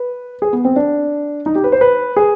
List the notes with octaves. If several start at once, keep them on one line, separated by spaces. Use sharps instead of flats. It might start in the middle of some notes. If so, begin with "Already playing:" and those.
Already playing: B4
G#4
B3
C4
D4
D#4
G4
B4
C5
B4
G#4